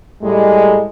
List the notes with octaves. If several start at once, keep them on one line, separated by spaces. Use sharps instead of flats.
A2 G3 G#3